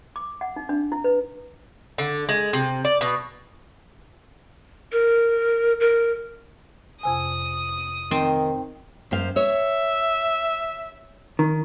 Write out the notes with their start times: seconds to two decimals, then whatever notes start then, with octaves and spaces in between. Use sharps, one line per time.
0.16 D6
0.41 F#5
0.56 D#4
0.69 D4
0.92 E4
1.04 B4
1.98 D3
2.29 G#3
2.53 C3
2.85 D5
3.01 B2
4.92 A#4
5.80 A#4
7.03 F2 C3 G#5 D#6
8.11 D#3 C4
9.11 F#2 C5 F5
9.36 C#5 E5
11.39 D#3